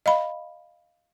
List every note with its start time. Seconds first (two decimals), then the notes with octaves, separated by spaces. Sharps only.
0.06 D#5 F5 B5